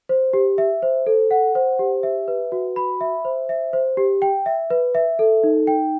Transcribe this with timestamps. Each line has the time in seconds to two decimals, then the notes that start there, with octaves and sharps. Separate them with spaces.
0.09 C5
0.33 G4
0.58 E5
0.82 C5
1.07 A4
1.31 F#5
1.55 C5
1.79 G4
2.03 E5
2.28 B4
2.52 F#4
2.76 B5
3.01 E5
3.25 C5
3.49 E5
3.73 C5
3.97 G4
4.22 G5
4.46 E5
4.70 B4
4.95 E5
5.19 A4
5.43 D#4
5.67 G5